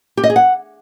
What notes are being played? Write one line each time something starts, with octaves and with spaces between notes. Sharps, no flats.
G4
D#5
G#4
F#5